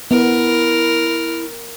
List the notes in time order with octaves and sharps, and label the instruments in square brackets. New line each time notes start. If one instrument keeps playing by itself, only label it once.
[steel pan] B3 [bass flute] E4 [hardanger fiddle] A#4